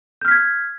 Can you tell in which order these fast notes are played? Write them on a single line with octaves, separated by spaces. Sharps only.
G6 F6 B6 G#6